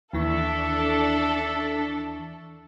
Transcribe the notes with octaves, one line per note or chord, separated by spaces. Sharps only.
D#2 E3 D4 A4 E5 C#6